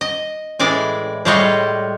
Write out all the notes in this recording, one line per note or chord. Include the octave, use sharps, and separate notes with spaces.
D#5
A2 E3 G#3 D5 G#5
A2 G3 G#3 F4 C#5 D#5